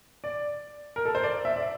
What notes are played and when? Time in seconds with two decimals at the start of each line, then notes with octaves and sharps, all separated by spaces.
0.24 D5
0.96 A#4
1.05 A4
1.15 C5
1.24 D5
1.45 E5
1.56 D5